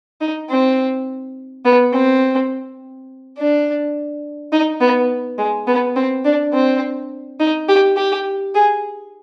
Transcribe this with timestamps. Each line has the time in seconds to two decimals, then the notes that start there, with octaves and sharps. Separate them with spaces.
0.21 D#4
0.50 C4
1.65 B3
1.93 C4
3.38 D4
4.52 D#4
4.81 B3
5.38 G#3
5.67 B3
5.96 C4
6.25 D4
6.53 C4
7.40 D#4
7.69 G4
7.97 G4
8.54 G#4